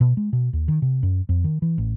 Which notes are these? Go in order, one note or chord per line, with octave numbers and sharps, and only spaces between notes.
B2
G#3
B2
D#2
D#3
C3
F#2
F2
D#3
E3
A1